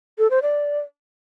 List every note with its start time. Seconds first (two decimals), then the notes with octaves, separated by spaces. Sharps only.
0.18 A4
0.30 C5
0.42 D5